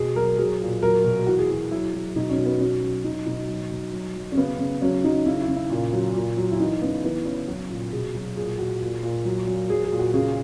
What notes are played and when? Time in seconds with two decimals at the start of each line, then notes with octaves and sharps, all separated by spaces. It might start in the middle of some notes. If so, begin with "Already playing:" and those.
Already playing: B2 G#4
0.16 F#3 A#4
0.38 F#3 G#4
0.61 A#2
0.82 F#3 A#4
1.04 B2
1.27 E3 F#4
1.39 G#4
1.49 E3 F#4
1.71 F#3 E4
1.94 F#3
2.16 B2 D#4
2.30 C#4
2.38 B2
2.46 B3
2.61 F#3 C#4
2.82 F#3
3.04 F#3 D#4
3.27 B2 D#4
3.48 F#3
3.71 B2
3.93 F#3
4.16 F#3
4.32 C#4
4.37 C#3 B3
4.59 C#3
4.82 F#3 C#4
5.04 F#3 D#4
5.26 C#3 E4
5.41 E4
5.48 C#3
5.56 E4
5.70 A#2
5.93 F#3
6.14 A#2
6.37 F#3
6.51 E4
6.59 E3 D#4
6.81 C#3 B3
7.04 E3 B3
7.25 C#3 C#4
7.48 F#3 F#4
7.70 A#2
7.92 B2 G#4
8.15 F#3
8.36 A#2 G#4
8.59 A#2 F#4
8.81 A#2
9.03 A#2
9.25 F#3
9.47 F#3
9.70 F#3 G#4
9.85 G#4
9.92 A#2
9.99 F#4
10.14 C#3 G#4